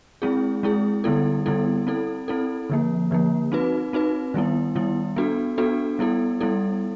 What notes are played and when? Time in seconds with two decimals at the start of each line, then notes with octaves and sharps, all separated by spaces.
0.22 G#3 C4 E4 G#4
0.63 G#3 C4 E4 G#4
1.04 D3 G3 B3 E4 A4
1.46 D3 G3 B3 E4 A4
1.87 C4 E4 A4
2.28 C4 E4 A4
2.70 D3 F3 A#3
3.11 D3 F3 A#3
3.52 C4 D#4 F#4 B4
3.93 C4 D#4 F#4 B4
4.34 D#3 G3 B3 E4
4.76 D#3 G3 B3 E4
5.16 B3 D4 F#4 A4
5.58 B3 D4 F#4 A4
5.99 G3 B3 E4 A4
6.41 G3 B3 E4 A4